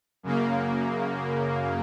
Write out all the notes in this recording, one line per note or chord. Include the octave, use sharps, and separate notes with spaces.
F#2 C#3 A#3